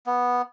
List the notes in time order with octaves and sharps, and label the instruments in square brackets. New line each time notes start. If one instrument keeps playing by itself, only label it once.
[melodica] B3